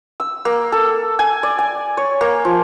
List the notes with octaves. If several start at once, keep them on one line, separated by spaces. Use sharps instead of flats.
E6
A#3
A4
G#5
D5
G#5
C#5
A#3
F3